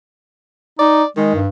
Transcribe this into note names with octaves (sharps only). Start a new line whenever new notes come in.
D#4 D5
D#3 G#3
G2